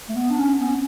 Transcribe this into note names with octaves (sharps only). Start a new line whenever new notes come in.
A3
B3
D4
C#4
B3
C#4